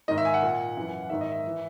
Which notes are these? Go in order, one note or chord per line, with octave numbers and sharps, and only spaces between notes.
G#2 D#3 D#5
E5
G#5
F#5
A#2
F#2 E3
G#2 D#3 E5
D#5
E5
E3